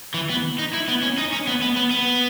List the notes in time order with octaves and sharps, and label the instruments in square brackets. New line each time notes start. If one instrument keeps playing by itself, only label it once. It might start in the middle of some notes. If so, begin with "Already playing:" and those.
[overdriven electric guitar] E3
B3
D#4
E4
B3
C#4
D#4
C#4
B3
B3
B3
B3